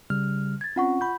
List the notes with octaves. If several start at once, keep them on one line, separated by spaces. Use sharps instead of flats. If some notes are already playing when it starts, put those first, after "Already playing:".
C#3 G3 F6
G#6 A6
C4 C#4 F4 F#5 C#6
B5 G6